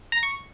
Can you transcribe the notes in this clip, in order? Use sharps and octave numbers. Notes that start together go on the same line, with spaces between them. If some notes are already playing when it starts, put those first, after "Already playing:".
A#5
A#6
C#6